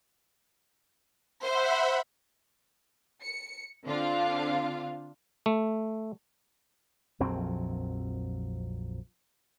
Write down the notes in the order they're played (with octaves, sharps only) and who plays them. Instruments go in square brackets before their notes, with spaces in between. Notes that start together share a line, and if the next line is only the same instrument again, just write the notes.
[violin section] C5 [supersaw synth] E5 F#5 B5
[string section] C#7
D3 C4 D4 F4 F5
[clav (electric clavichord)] A3
[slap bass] A#1 F2 F#3 C4